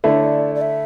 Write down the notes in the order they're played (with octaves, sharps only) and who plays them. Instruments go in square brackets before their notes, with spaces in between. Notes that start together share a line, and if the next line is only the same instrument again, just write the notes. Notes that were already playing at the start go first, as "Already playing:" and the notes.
[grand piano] D3 A3 E4 [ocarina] D5
[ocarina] C#5
D5
D5
E5